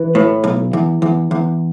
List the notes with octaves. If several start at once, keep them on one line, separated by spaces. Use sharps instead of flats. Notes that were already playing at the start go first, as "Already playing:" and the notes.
Already playing: E3
A2
B1
E2
E2
E2